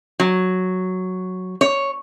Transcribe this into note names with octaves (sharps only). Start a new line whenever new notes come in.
F#3
C#5